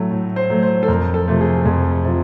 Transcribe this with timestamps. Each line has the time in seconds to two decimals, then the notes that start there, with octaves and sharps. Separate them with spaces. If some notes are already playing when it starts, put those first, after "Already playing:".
Already playing: A2 F#3 A3
0.11 A2
0.36 C5
0.50 F#3 A3
0.63 C5
0.83 A4
0.88 F2 A#4
1.14 A4
1.28 C3 F3 A3
1.41 G#4
1.66 F2 G#4
2.05 C3 F3